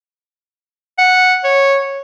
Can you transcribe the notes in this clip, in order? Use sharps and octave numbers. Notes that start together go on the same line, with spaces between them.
F#5
C#5